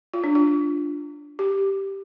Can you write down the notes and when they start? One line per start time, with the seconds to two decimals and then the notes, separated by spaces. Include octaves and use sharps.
0.14 F4
0.24 D4
0.35 F4
1.39 G4